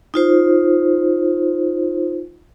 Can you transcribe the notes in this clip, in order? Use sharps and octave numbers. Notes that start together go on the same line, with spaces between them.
D#4 F4 C5